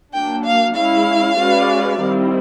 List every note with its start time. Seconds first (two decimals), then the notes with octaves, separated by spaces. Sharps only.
0.13 F#3 A#3 D4 G5
0.44 F5
0.75 G#3 C#4 E4 F5
1.38 G#3 C#4 F#4 B4 D5
1.99 D#3 G3 C4 E4